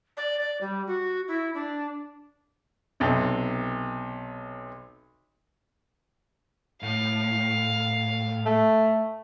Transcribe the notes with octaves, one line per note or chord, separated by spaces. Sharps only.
D5
D5
G3
F#4
E4
D4
B1 C3
A2 F5
A3